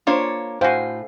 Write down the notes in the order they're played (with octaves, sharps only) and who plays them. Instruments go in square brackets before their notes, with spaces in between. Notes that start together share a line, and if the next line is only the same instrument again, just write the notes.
[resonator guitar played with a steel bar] A#3 D4 C#5 [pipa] F4 C5
[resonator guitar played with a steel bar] A2 [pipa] F#4 G5 [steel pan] C5 F5 G#5